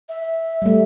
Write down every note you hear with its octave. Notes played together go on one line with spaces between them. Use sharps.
E5
G3 A3